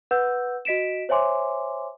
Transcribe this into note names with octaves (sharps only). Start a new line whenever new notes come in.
B4 F#5 E6 G6
F#4 D#5 B6 D7 E7
C5 C#5 E5 G#5 C6 D6